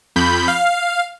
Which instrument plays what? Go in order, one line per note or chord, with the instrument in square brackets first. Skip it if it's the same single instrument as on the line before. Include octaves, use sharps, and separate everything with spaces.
[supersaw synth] F2 B5 G6
F5